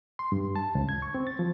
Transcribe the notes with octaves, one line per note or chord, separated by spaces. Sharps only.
C6
G2
A5
C#2
G#6
C#6
C4
A6
F3